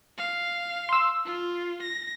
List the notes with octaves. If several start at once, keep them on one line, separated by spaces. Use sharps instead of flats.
F5
C6 E6
F4
A#6